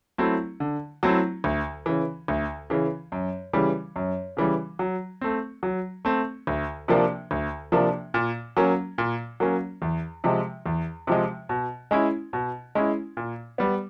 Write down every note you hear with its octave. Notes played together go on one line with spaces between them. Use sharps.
F#3 A3 C4 E4
D3
F#3 A3 C4 E4
D2
C#3 E3
D2
C#3 E3
F#2
C#3 E3 G3
F#2
C#3 E3 G3
F#3
A3 C4
F#3
A3 C4
D2
C3 F3 A#3 D4
D2
C3 F3 A#3 D4
A#2
F#3 A#3 C#4
A#2
F#3 A#3 C#4
E2
C3 F3 G#3
E2
C3 F3 G#3
B2
G#3 C#4 E4
B2
G#3 C#4 E4
A#2
G3 B3